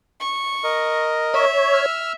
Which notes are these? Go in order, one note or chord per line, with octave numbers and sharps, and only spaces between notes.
C#6
A#4 D#5
C#5 E5
E6 F6